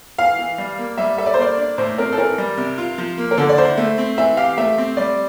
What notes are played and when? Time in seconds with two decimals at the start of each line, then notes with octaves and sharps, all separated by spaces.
0.18 E3 F5
0.39 E3
0.58 G3
0.78 A#3
0.98 G3 E5
1.18 A4 E5
1.26 D5
1.34 C5
1.38 A#3 D5
1.57 D4
1.78 A2 C5
1.98 C4 A#4
2.13 A4
2.17 E3 A#4
2.38 G3
2.57 C3
2.78 F4
2.98 F3
3.18 A#3
3.31 A#4
3.37 D3 A4
3.49 D5
3.58 E4 C5
3.77 A3
3.98 C4
4.17 E3 E5
4.37 G4 F5
4.58 A3 E5
4.78 C4
4.97 G3 D5